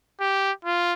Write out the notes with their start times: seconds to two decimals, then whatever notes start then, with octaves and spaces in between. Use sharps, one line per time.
0.20 G4
0.65 F4